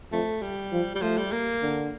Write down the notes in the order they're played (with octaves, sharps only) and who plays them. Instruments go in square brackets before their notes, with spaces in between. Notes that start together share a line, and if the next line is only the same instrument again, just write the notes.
[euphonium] F2 [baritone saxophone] A3
[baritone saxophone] G3
[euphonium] F3
[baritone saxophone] G3
[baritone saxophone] F3 [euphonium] A3
[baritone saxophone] G3
A#3
[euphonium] D3